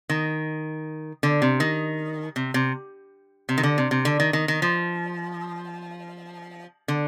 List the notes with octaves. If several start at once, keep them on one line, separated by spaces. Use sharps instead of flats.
D#3
D3
C3
D#3
C3
C3
C3
D#3
D3
C3
C3
D3
D#3
D#3
D#3
F3
D3